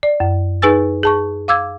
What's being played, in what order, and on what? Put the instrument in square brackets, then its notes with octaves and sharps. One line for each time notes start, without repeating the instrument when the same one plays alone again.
[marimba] D5
F#2
D#4 G#4 B4 G#5 E6 A6
G#4 A5 C#6
F5 D6 E6 G#6